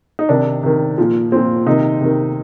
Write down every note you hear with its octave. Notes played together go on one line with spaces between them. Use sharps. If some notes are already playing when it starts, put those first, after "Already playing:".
D#4
C3 D#3 D4
C3 D#3
A#2 F3
A#2 F3 C4
C3 D#3 D#4
C3 D#3